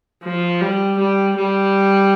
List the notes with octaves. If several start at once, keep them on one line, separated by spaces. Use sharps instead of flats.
F3
G3
G3
G3